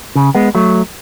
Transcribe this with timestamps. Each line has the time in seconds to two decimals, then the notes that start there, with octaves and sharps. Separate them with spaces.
0.15 C#3
0.35 G#3 B3
0.55 F#3 A3